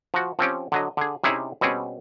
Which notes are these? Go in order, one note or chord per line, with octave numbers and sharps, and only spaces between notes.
F3 F#4
F3 C4 C#4 G4
D3 F#3 D#5
D3 G#4
C3 C#4 D#4 E4 G#4
B2 G3 C4 C#4 G#4